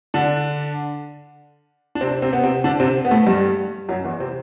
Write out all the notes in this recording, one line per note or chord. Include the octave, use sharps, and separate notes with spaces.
D3 D4
D4
C3 C4
C3 C4
B3
C3 C4
D3 D4
C3 C4
B3
A2 A3
G2 G3
F#2 F#3
E2 E3
C3 C4